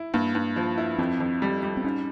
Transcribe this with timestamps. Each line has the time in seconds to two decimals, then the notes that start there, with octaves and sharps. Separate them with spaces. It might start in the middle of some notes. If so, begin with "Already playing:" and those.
Already playing: E4
0.14 G2 A#3
0.35 G2
0.56 F3
0.78 E4
0.99 F2 C4
1.20 F2
1.42 G3
1.63 G3
1.77 C4
1.84 G#2 C#4